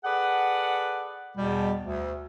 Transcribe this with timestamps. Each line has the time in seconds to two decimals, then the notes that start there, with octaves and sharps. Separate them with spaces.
0.04 G#4 A4 B4 D5 F#5
1.37 E2 B2 G3
1.83 D2